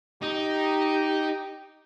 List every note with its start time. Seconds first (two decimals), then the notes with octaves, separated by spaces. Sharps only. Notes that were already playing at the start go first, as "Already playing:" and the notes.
0.22 D#4 G4